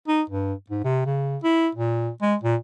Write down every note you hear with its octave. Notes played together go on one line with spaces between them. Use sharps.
D#4
G2
G#2
C3
C#3
E4
A#2
G#3
A#2